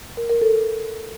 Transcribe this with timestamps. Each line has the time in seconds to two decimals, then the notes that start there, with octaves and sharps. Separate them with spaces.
0.17 A#4
0.30 A#4
0.41 A4